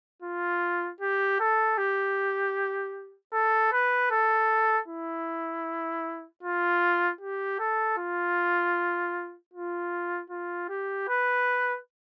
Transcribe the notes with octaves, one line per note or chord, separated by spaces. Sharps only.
F4
G4
A4
G4
A4
B4
A4
E4
F4
G4
A4
F4
F4
F4
G4
B4